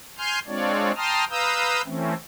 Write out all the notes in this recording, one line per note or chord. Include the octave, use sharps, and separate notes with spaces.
G#5 C6 F6 G6
G#3 C4 D4 F4 C#5 D5
G5 A5 A#5 C6 D#6 F6
B4 F5 A#5 D#6 E6 G6
E3 A3 C4 C#4